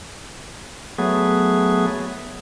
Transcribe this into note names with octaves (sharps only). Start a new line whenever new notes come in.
F#3 A3 B3 G#4